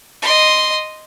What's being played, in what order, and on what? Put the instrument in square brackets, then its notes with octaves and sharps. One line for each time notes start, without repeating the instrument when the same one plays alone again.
[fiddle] D#5 C6